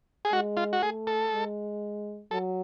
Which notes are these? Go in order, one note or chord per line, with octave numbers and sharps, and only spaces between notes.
G#4
G#3 F#4
F4
F#4
A3 G#4
A4
G#3
F#3 A4